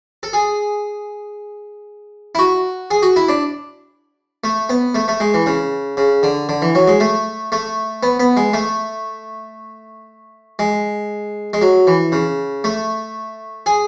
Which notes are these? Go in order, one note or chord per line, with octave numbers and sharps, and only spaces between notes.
A4
G#4
E4
F#4
G#4
F#4
E4
D4
A3
B3
A3
A3
G#3
E3
C#3
C#3
D3
D3
E3
F#3
G#3
A3
A3
B3
B3
G#3
A3
G#3
G#3
F#3
E3
C#3
A3
G#4